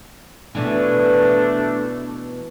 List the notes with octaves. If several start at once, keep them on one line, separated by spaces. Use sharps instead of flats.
B2 E3 A3 D4